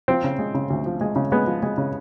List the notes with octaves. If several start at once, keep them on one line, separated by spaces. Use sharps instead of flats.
F3 C4
C#3
G#3
C#3
D2
F3
G#3
C#3
G#3 B3
F3
G#3
C#3